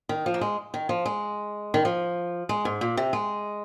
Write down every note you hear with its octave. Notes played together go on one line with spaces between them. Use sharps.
D#3
F3
A#3
G#3
D#3
F3
G#3
D#3
F3
G#3
G#2
A#2
C3
G#3